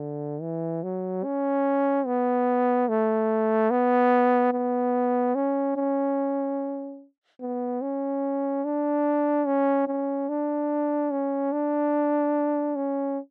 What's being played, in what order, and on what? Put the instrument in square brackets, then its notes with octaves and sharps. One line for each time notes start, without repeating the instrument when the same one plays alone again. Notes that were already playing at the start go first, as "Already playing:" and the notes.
Already playing: [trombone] D3
E3
F#3
C#4
B3
A3
B3
B3
C#4
C#4
B3
C#4
D4
C#4
C#4
D4
C#4
D4
C#4